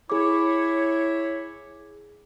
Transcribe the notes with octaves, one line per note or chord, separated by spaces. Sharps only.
E4 G#4 C#5 D6